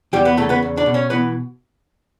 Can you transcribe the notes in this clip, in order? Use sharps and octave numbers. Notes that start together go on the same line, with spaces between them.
E2 G3 G4
B3 B4
C#3 A3 A4
B3 B4
E2
D4 D5
B2
C#4 C#5
E3 B3 B4